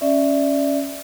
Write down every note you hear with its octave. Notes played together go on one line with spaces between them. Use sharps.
C#4 D5 E5